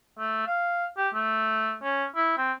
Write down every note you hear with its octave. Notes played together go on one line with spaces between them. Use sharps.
A3
F5
G4
A3
C#4
E4
C4